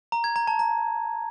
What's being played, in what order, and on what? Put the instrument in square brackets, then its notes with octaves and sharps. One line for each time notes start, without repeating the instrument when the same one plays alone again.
[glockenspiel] A#5
G#6
A#5
A5
A#5